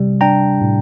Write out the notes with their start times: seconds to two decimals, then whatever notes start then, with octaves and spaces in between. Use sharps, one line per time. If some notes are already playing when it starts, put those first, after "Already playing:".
Already playing: C3 G3
0.21 D4 G5 A#5
0.61 A2